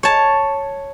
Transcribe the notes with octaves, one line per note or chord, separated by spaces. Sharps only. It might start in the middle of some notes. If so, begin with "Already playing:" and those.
C#5 A5